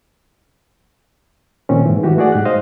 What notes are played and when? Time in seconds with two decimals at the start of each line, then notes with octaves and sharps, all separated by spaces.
1.69 A#2 D#3 C4 C#4
1.86 G#2 E3
2.03 D#3 E3 F#4 G4
2.17 A3 F#4 G#4 D5 F#5
2.32 G#2 G4 F#6
2.45 C5 D#5 F5